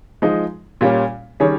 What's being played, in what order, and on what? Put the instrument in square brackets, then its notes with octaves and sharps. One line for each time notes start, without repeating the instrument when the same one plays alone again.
[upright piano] F3 G#3 D#4
A#2 G3 A#3 C#4
D#3 G3 C#4 G#4 C#5